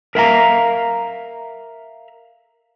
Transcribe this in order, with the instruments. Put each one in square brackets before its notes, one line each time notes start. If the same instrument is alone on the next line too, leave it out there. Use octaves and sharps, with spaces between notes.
[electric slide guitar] A#4 E5 F5 A#5